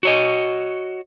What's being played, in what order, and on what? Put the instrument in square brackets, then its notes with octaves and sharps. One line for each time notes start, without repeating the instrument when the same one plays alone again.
[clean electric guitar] F#4 C#5 D#5